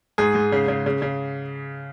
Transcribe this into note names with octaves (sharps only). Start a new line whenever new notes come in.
G#2 G#4
G#2
C#3
C#3
C#3
C#3